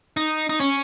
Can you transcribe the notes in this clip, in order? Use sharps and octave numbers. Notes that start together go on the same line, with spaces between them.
D#4
D#4
C#4